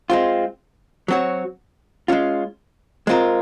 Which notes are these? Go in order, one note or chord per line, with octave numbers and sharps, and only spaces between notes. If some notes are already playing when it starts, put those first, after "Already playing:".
G#3 C4 F4
F#3 C4 F#4 C#5
G#3 C#4 F4
G#3 C4 F4 A#4